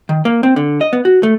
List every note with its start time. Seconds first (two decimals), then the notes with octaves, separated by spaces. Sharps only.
0.09 D#3
0.25 A#3
0.43 C4
0.56 D3
0.81 D#5
0.93 B3
1.05 F#4
1.23 A3